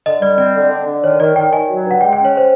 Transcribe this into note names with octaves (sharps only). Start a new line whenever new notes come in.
D3 D#5
G3 D5
C4 D5
D3
D3
D3
D#3 C#5
D#3 D5
D#3 G5
D#3 G#5
F#3
G2
F#5
G#3 G5
C#4 G5
C#5
G#3 C5